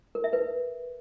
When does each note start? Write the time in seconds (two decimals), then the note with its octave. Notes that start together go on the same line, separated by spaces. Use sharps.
0.15 A#4
0.24 E5
0.33 B4